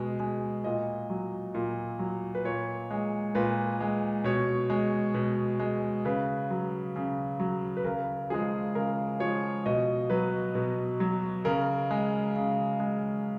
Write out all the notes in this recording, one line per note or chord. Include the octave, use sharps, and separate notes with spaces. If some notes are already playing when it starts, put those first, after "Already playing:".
Already playing: B2 G#3
G#3
A#2 D#5
F#3
A#2
F#3
B4
A#2 C#5
G#3
A#2 B4
G#3
B2 C#5
G#3
B2
G#3
C#3 B4
F#3
C#3
F#3
B4
C#3 A#4
F3 G#3 G#4
C#3 A#4
F3 G#3 C#5
B2 D#5
F#3 B4
B2
F#3
C#3 A#4
G#3
C#3
G#3